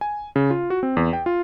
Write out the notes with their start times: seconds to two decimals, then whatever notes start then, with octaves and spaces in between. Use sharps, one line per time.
0.01 G#5
0.36 C#3
0.50 F4
0.70 F#4
0.83 C4
0.97 E2
1.13 G5
1.26 F4